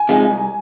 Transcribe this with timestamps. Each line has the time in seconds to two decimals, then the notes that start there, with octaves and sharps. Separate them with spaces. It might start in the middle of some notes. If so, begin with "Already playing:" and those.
Already playing: G#5
0.09 C3 F3 G#3 D#4
0.30 C2